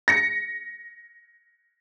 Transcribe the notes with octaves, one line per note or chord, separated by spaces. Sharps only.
A#6 C#7